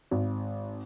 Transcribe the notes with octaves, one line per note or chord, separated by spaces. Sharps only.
G#1